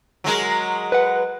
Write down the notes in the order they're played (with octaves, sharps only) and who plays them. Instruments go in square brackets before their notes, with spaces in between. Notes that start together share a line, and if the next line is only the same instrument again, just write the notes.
[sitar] F#3 G#3 A#4
[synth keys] B4 F#5